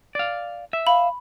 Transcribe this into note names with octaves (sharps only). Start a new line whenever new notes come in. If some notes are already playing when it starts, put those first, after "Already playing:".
D5 F5
E5
F5 B5